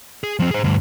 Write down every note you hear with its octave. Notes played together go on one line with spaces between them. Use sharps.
G#4
F3 C4
G#4 C5
D2 G2